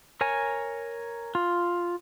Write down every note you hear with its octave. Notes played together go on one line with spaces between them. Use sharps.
A#4 C#5 G#5
F4